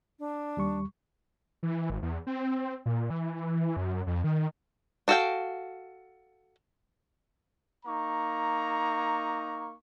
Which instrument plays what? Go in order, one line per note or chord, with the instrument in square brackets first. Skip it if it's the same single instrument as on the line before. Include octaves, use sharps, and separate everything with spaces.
[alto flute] D4
[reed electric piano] D#2 G3 C#6
[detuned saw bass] E3
G#1
E2
C4
A#2
E3
F#2
F2
D#3
[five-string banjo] D4 F#4 A4 F5 G5
[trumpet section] A#3 D#4 A#5 C#6